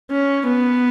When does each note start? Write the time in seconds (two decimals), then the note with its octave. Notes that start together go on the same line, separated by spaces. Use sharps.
0.11 C#4
0.47 B3